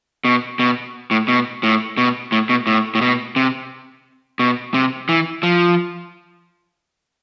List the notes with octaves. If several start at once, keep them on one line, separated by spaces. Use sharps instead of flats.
B2
B2
A2
B2
A2
B2
A2
B2
A2
A2
B2
C3
B2
C3
E3
F3